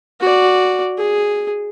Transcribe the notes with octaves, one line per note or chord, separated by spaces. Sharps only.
F#4 D5
G#4